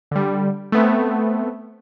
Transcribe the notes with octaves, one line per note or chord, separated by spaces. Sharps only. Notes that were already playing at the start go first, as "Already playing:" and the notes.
D3 G3
A3 B3 C4